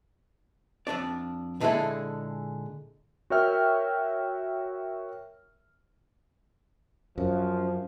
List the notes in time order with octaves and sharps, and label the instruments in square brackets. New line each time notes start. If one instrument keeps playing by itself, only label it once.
[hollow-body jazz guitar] F2 B2 D4 D5
A#2 D3 G#3 E4 G#4 A4
[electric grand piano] F#4 A#4 C#5 E5 G5 F6
[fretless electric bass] F#2 [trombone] F3